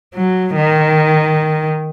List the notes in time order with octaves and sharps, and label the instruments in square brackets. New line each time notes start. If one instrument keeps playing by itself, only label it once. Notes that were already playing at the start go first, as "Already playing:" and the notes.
[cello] F#3
D#3